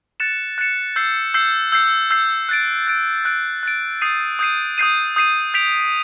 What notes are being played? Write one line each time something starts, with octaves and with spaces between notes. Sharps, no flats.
F#6 A6 C#7 E7
F#6 A6 C#7 E7
E6 G6 C7
E6 G6 C7
E6 G6 C7
E6 G6 C7
F#6 A6 D7
F#6 A6 D7
F#6 A6 D7
F#6 A6 D7
D#6 G6 C7 D#7
D#6 G6 C7 D#7
D#6 G6 C7 D#7
D#6 G6 C7 D#7
G6 B6 D7 F7